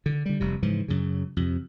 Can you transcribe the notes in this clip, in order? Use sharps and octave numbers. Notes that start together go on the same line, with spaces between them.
D3
D3 G3
F1 C3 G3
G#2 C#3 E3 F3
F#2 C#3
F2 C3